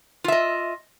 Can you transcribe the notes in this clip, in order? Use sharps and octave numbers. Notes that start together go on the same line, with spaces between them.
F4 D#5 E5